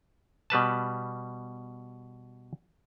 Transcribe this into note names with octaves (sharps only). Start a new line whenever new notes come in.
B2 G3 B4 A5